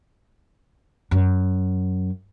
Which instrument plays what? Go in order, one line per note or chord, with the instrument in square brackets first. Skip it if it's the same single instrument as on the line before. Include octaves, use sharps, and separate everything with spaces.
[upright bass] F#2